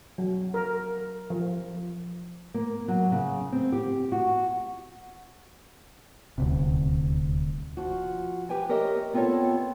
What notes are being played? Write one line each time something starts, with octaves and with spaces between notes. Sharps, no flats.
F#3
A#4
F3
A#3
F#3
C#3
C4
G4
F#4
D#1 D2 C3
F3 F#4
G4 B4 G5 G#5
G4 A#4 C#5 D#5 E5
B3 C4 F4 A4 C#5 A5